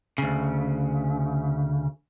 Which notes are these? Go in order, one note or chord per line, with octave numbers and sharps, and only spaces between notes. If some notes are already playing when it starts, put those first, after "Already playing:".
D2 C#3